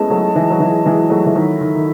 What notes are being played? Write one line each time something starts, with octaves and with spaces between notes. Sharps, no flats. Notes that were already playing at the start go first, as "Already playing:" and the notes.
Already playing: G#3 A3 B3 C#4 E4 G#4 D#5 A5
F#3 A3
E3 G#3
F#3
E3
E3 G#3
F#3 A3
E3
D#3 F#3 E4 A4 E5
D#3
D#3